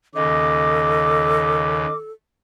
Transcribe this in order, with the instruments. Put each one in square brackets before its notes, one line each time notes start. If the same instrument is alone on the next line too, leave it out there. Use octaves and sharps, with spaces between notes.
[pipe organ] D#2 C#3 [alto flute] A4 [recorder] D#5 [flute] D6